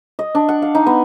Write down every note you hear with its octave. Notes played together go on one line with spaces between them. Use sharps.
D#5
D4
F#5
F5
D#4
B3